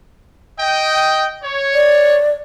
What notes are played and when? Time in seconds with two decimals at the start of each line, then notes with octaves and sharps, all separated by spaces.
0.59 D#5 G5
1.43 C#5
1.74 D5